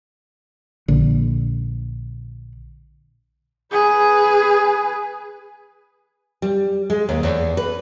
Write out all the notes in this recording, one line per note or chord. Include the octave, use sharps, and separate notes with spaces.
A#1 D3
G#4 B4
G3
G#3
D#2
E2
B4